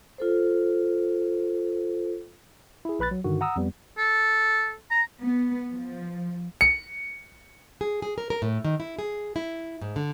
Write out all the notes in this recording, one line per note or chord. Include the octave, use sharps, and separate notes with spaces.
F4 A4 C5
E4 G#4
A#1 B4 B5 F#6 A6
F#3
G2 D3 D#3 F#4
F#5 A#5 D#6 E6
F2 G3 B3
A4
A#5
B3
F3
C#7
G#4
G#4
A#4
A#4
A2
D#3
E4
G#4
E4
G#2
D3